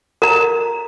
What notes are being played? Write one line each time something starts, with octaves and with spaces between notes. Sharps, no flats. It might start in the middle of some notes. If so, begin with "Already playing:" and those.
A#4 A#5